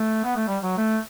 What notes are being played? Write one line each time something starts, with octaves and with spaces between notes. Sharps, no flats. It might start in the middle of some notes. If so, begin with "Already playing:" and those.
Already playing: A3
B3
A3
G3
F#3
A3